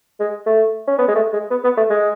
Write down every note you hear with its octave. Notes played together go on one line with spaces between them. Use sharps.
G#3
A3
C#4
B3
G#3
A3
G#3
B3
B3
A3
G#3